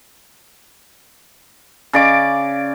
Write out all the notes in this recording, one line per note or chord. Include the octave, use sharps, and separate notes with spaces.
C#3 D5 D6